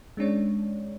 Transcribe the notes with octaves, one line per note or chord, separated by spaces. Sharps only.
G#3 C#4 D4 C#5